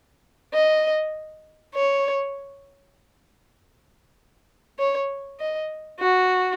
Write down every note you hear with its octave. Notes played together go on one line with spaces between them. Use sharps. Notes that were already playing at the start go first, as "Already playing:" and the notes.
D#5
C#5
C#5
D#5
F#4